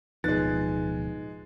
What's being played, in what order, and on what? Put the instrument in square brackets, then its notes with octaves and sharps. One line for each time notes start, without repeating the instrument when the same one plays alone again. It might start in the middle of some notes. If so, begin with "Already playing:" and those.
[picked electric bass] D1 B2 F3 [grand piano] G#3 A6 [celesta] D#4 B4 F#6